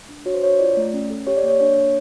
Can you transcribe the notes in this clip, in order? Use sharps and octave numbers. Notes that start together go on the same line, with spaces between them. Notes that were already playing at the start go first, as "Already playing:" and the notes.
D4
F#4 C#5
C5
D4 C#5
F4 D5
A3
C#4
A4
G4 C#5
D5
A#3
C#5
D4 C#5
A#3